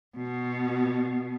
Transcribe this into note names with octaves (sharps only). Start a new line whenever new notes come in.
B2